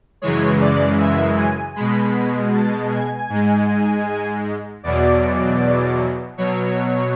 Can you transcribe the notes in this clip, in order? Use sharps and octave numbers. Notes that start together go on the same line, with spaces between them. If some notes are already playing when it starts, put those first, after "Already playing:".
F#2 C#3 E3 G#3 C#5
D5
E5
G#5
B2 G#3 B5
A5
G#5
G#2 G#3
E2 B2 F#3 D5
B2 F#3 C#5